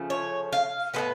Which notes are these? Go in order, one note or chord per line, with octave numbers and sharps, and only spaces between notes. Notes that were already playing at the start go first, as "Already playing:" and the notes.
Already playing: C#3 F3 A3
C#5
F5
A2 G#3 B3 B4